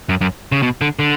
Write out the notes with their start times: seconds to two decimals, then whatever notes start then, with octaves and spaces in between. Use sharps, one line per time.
0.09 F#2
0.21 F#2
0.52 C#3
0.63 B2
0.81 D3
0.99 D3